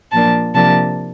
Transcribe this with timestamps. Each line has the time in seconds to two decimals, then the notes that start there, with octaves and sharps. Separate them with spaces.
0.12 A#2 F3 A#3 D4 A5
0.54 C3 F3 A#3 D4 A5